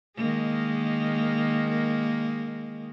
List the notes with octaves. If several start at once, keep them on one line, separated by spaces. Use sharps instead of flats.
D#3 G#3 A#3